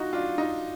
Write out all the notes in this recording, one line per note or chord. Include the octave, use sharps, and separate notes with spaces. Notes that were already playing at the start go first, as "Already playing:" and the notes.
Already playing: D#4 F4 F#4
D4 F4
D#4